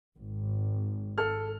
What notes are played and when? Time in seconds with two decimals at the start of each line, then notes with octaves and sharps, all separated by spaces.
0.16 G#1
1.18 A4 F6